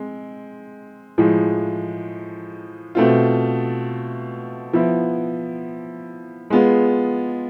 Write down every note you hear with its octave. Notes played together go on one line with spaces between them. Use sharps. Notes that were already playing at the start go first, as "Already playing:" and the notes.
Already playing: G#3 C4
A2 F3 G#3
B2 A3 C4 F4
F3 B3 E4
G#3 B3 F4 G#4